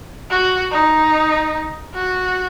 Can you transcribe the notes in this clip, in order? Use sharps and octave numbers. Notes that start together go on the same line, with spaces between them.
F#4
D#4
F#4